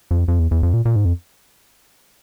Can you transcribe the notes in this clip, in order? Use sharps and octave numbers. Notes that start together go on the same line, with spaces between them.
F2
F2
E2
E2
F2
A#2
A#2
G#2
F2